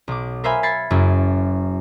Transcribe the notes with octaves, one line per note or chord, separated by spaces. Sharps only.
B1 D6
A#4 C5 E5 F5 G#5 B5
B5 G#6 A6 C7 C#7
F#1 F#2 F#3 E4